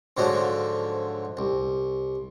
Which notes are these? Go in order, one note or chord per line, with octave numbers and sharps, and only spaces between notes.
G#2 D3 F3 F#3
C2